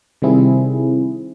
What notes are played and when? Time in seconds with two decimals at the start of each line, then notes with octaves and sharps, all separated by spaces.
0.22 C3 D#3 G3 C4 E4 G#4